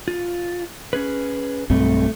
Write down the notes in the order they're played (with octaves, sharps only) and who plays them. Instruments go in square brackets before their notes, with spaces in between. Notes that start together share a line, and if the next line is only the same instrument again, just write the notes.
[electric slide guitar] F4
C#4 G#4 B4
[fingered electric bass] B1 G2 C4 [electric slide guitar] A3